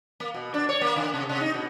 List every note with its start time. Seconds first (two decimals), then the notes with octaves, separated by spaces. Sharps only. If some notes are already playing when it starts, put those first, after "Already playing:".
0.20 A#3
0.34 B2
0.54 D4
0.69 C#5
0.81 A#3
0.96 D3
1.14 C3
1.29 C3
1.41 D#4
1.54 B2